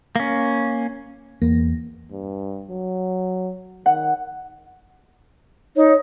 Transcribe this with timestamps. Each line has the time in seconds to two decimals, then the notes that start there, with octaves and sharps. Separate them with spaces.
0.16 A#3 C#4
1.42 E2 A#3
2.12 G2
2.70 F#3
3.86 D#3 F#5
5.76 D#4 C#5